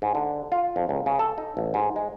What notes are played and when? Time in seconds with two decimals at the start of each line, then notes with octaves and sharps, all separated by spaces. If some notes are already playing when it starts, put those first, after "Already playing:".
0.02 G#2
0.15 D3
0.52 F4
0.76 F2
0.89 C#2
1.06 C#3
1.19 A4
1.38 D#4
1.57 A1
1.74 G#2
1.96 G#3